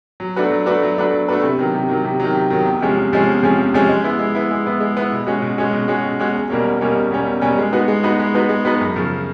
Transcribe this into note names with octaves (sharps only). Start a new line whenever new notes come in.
F#3
A3 D4 F#4 B4
F#3
A3 D4 F#4 B4
F#3
A3 D4 F#4 B4
F#3
A3 D4 F#4 B4
C3
D#3 F#3
C3
D#3 F#3
C3
D#3 F#3
C3
D#3 F#3
E2
C3 F3 G#3 C#4
E2
C3 F3 G#3 C#4
E2
C3 F3 G#3 C#4
E2
C3 F3 G#3 C#4
G#3
B3 E4
G#3
B3 E4
G#3
B3 E4
G#3
B3 E4
B2
G#3 C#4 F#4
B2
G#3 C#4 F#4
B2
G#3 C#4 F#4
B2
G#3 C#4 F#4
E2
B2 G3 A#3 C#4
E2
B2 G3 A#3 C#4
E2
B2 G3 A#3 C#4
E2
B2 G3 A#3 C#4
G#3
B3 D#4 F#4 B4
G#3
B3 D#4 F#4 B4
G#3
B3 D#4 F#4 B4
G#3
B3 D#4 F#4 B4
F#2
C#3 F3